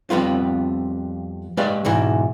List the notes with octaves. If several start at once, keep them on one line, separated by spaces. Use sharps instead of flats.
F2 G3 B3 F4
G#3 G4 B4 D5 F5
E2 G#2 B2 E3